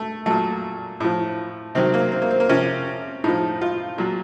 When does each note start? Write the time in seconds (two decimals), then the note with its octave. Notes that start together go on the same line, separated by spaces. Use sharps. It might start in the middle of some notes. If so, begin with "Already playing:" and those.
Already playing: A3
0.26 A#2 F#3 A3
1.00 A2 F3
1.75 C3 D#3 F#3 C4
1.94 A#3
2.12 C4
2.22 A#3
2.31 C4
2.40 A#3
2.49 C3 F3 C#4
3.24 A2 F3 D#4
3.61 F4
3.98 A#2 F#3